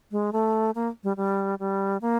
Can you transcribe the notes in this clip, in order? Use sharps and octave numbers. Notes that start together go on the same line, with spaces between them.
G#3
A3
A#3
G3
G3
G3
A#3